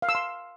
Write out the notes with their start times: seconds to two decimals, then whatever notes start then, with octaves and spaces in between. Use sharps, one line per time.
0.02 F5
0.09 E6
0.15 C6